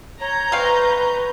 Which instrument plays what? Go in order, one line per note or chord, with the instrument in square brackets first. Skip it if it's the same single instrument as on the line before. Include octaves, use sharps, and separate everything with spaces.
[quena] C#5 [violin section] A#5 G6
[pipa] G#3 C4 F5 [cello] B4 [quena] C#6